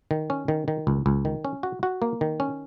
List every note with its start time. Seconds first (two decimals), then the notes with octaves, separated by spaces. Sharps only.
0.11 D#3
0.30 C#4
0.48 D#3
0.68 D#3
0.87 C#2
1.06 C#2
1.25 D#3
1.45 C#4
1.63 F#4
1.83 F#4
2.02 A#3
2.21 D#3
2.40 C#4